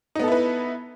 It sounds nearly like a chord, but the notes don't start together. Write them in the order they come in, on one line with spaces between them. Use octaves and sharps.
D#4 B3 A4 E4 B4